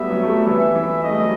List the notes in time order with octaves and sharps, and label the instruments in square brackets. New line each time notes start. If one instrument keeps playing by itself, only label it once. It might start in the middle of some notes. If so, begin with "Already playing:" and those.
Already playing: [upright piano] F#3 G3 A3 B3 [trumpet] E5
[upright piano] F#3
A3
G3
[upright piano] E3 [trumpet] E5
[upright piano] E3
[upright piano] A3 [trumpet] D#5
[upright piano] G3
F#3